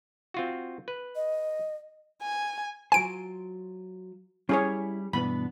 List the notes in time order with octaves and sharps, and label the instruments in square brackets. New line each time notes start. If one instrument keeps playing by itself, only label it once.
[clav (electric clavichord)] C4 F4 F#4
B4
[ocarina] D#5
[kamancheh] G#5
[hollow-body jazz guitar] F#3 F4 C5 [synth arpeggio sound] G#5 D7
[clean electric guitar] G3 [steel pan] C#4 G#4 C#5 [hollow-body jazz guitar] E4
[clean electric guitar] G2 B2 D4 [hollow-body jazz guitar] E3 B3 B4 [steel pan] B5